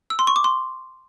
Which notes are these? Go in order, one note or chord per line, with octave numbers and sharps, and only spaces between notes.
E6
C6
C#6
D6
C6